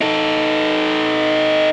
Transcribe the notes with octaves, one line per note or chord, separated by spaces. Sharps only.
D#4 A4